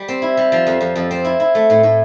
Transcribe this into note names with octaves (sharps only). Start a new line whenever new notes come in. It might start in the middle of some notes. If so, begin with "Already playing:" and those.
Already playing: G3
C4
E4
G3
F3
F2
F2
F2
C4
E4
E4
A3
A2
A2